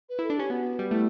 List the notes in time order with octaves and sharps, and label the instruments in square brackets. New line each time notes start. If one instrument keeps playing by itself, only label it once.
[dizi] B4
[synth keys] E4 [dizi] A4
[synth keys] D4
[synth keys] C#4 [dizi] G4
[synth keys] B3 [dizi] F#4
[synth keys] G3
[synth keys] A3 [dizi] E4